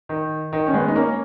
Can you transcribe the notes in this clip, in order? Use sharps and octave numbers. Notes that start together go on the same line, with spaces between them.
D#3
D#3
C#4
G#3 B3
D#4
A#3 C#4